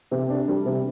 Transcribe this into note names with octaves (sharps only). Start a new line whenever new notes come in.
C3
D4
G3
C3